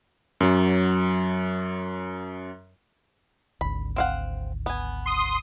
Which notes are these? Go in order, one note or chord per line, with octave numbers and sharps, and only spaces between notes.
F#2 F#3
G#1 D2 B5
C4 F5 F#5
B3 G#5
C6 D#6